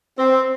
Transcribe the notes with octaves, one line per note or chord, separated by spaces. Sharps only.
C4